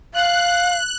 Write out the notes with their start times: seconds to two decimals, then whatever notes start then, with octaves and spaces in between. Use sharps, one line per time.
0.14 F5 F#6